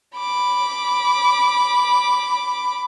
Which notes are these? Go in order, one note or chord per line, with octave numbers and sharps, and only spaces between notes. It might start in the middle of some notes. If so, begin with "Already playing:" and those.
B5 D6